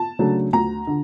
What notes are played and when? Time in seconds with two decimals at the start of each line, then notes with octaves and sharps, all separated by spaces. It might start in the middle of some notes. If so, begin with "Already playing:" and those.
Already playing: A5
0.19 C#3 F#3 A3 D4
0.53 D2 A#5
0.87 D3